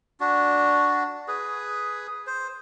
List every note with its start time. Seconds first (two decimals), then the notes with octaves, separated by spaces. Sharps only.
0.20 D4 F#4
1.28 G#4 B4
2.27 C5